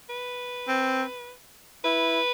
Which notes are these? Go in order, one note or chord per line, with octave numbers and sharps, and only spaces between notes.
B4
C4
E4 B4